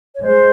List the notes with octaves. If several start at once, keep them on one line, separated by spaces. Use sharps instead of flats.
C#5
G#3 C5